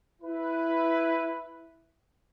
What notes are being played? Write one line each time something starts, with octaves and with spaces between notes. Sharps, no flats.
E4 B4